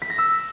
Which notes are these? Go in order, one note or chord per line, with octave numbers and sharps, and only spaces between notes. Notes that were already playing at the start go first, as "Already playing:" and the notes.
B6
A#6
E6